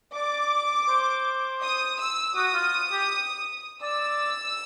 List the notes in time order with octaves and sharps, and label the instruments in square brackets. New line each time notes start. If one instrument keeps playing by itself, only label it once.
[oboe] D5 [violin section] D6
[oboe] C5
[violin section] D#6
E6
[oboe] F#4 [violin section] D#6
[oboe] F4
G4
[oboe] D5 [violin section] E6